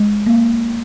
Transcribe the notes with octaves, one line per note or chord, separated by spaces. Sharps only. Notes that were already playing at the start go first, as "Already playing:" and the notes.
Already playing: G#3
A#3